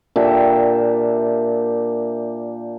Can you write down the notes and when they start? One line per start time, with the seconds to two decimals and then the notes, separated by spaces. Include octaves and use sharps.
0.16 A#2 D4 G4 E5